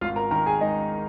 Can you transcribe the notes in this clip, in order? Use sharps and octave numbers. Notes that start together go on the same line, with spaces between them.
G#1 F4 F5
A#4 A#5
D#3 A#4 A#5
G#4 G#5
G#3 D#4 D#5